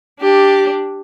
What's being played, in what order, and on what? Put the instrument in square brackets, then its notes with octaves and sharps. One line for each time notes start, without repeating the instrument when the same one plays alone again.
[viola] D4 G4